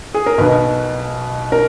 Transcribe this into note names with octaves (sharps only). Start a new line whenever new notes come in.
G#4
A#4
B1 B2 B4
A#4